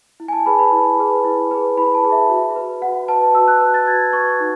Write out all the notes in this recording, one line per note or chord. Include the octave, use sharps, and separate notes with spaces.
E4
G#5
A5
G#4 B4 B5
B5
E4
G#4 B4
E4
G#4 B4
E4 B5
A5
G#4 B4
E5
F#4
B4
F#4 F#5
B4 A5
F#4 E6
F#6
B4 F#6
A6
F#4 G#6
B4 C#6
D#4